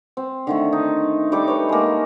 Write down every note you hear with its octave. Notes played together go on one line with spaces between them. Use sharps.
C4
D3 D#3 A3
D#4
G3 D#4 A4 D6
B4 C#5
G#3 A#3